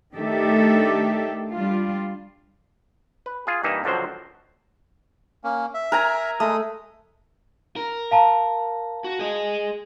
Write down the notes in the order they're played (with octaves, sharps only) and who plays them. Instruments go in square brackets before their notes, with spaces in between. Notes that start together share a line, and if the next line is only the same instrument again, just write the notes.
[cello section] D#3 A3 D4 G4 A4 E5
G3 D4 F4
[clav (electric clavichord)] B4
F4 G#4
G2 E3 A#3 D#4 E5
C#2 D3 F3 F#3 C5
[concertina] A#3 C#4
E5
[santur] A#4 G#5 A#5
[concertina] G#3 D#6 [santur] A3
[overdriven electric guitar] A#4
[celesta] F5 A5 A#5
[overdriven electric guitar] F#4
G#4 D#5